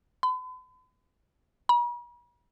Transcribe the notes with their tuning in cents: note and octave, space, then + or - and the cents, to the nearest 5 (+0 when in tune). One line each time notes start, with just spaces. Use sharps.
B5 +45
B5 -45